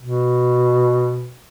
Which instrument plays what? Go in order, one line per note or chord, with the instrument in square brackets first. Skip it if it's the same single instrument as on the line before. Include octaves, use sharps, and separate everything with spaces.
[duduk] B2